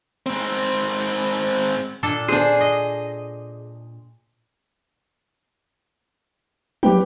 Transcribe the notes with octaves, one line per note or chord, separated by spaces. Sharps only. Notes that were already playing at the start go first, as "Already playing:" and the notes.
G#2 C4
A#2 D4 A4
D4 G#4 C5
D#5
F#3 G4 B4 G5